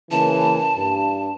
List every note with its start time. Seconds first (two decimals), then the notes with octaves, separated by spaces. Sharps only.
0.11 C#3 E3 A#3 A5
0.75 G2